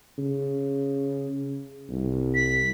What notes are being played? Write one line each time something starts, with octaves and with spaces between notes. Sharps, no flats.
C#3
C2
B6